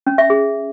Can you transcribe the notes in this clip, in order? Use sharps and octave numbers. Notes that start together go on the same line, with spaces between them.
C#4
E5
G#4